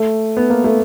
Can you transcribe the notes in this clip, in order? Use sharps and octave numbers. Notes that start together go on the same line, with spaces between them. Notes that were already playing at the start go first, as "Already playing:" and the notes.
Already playing: A3
B3
A#3
A3